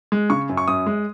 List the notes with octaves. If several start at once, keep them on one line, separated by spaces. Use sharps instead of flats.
G#3
C#3 C#6
F#2
C#6
F#2 D#6
G#3